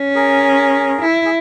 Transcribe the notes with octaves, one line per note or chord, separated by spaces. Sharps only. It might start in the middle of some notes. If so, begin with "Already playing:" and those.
Already playing: C#4
G#4 A#4
E4
G#4